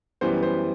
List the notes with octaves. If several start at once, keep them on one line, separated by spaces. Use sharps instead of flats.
F#2 E3 G3 B3 C5
C5